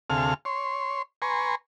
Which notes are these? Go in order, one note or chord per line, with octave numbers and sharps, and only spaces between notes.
D2 C3 G#4 A4 F5 F6
C#5 C6
B4 G#5 A#5 C6 C#6